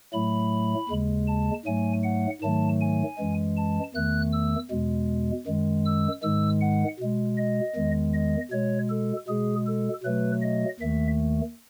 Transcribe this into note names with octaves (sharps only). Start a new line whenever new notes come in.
A2 F#3 A3 B5
D#2 C#3 G#3
A5
G#2 F#3 A3 G#5
F#5
G#2 D#3 F#3 A3 A5
G#5
F#2 E3 G#3
A5
E2 D#3 A3 F#6
E6
E2 B2 G#3
F#2 D#3 G#3
E6
G#2 D#3 G#3 E6
F#5
B2 G#3
D#5
E2 D#3 G#3
D#5
B2 G#3 C#5
A4
B2 G#3 G#4
A4
B2 F#3 A3 B4
D#5
D#2 D#3 A3 E5